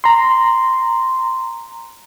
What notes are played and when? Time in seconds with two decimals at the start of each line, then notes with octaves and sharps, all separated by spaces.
0.04 A#5 C6